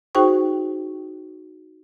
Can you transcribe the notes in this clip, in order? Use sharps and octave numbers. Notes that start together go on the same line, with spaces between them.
D#4 F#4 G#4 C5 G5 C#6